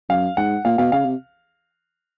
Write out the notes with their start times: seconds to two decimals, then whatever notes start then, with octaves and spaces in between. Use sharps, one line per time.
0.09 F#2 F5
0.37 G#2 F#5
0.65 A#2 F5
0.78 B2 F5
0.92 C#3 F5
1.05 C3